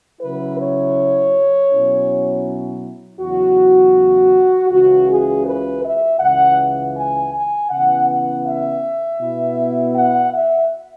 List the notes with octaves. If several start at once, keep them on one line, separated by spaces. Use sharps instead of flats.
C#3 F#3 E4 B4
C#5
B2 F#3 C#4 E4
E2 C#3 F#3 E4 F#4
C#2 C#3 E3 F#4
G#4
B4
E5
C#2 C#3 E3 F#5
G#5
G#5
C#3 E3 B3 F#5
F#5
E5
B2 B3 E4
F#5
E5